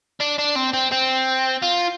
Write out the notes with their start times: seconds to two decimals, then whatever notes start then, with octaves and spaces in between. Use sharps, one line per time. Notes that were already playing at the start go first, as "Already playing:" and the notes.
0.20 D4
0.39 D4
0.56 C4
0.74 C4
0.92 C4
1.63 F4